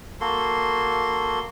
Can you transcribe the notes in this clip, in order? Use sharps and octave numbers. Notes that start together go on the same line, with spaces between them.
A#3 F#4 A4 C6